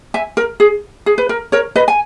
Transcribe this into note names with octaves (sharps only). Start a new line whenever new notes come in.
E5 G#5
A#4
G#4
G#4
B4
A#4
A#4 C#5
B4 D#5
G#5